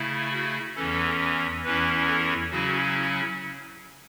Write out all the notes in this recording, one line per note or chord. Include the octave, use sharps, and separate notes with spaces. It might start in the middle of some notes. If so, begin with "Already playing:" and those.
Already playing: C#3 A3 E4
F#4
E2 E3 C#4 A4
E2 E3 C#4 E4 B4
A4
C#3 F#3 C#4 E4 F#4